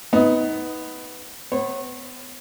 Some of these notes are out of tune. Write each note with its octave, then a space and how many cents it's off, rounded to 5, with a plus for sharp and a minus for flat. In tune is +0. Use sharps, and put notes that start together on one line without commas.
B3 +10 D#4 +25
B3 +30 C#5 -30